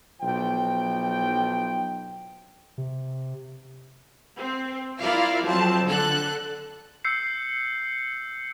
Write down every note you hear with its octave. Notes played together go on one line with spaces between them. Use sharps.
B1 F3 G5
C3
C4
E4 F4 A#4 D5 E5 F5
F2 F#3 C4 A5
D3 A4 F#6
E6 G6 C7 C#7